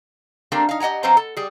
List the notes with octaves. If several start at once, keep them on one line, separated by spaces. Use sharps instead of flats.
G3 A3 A#3 C4 D4 A#4
D#4 F5
G4 D#5 F#5 G#5 A#5
F#3 B3 C4 C5 F5 A#5
A4
G3 G#4